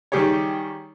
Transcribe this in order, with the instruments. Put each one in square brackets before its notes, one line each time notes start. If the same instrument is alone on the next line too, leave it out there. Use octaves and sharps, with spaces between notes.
[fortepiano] D#3 G3 D#4 G4 G#4 C#5